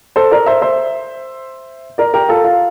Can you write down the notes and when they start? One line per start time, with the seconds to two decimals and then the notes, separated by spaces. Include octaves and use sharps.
0.16 A4 C5
0.31 A#4 D5
0.46 C5 E5
0.62 C5 E5
1.98 A#4 D5
2.14 G4 A#4
2.29 F4 A4
2.44 F4